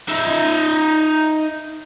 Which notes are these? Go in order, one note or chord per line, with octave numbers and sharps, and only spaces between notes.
D#4 E5